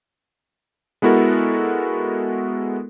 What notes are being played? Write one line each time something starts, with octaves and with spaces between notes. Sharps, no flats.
G#3 B3 E4 F#4 A4 A#4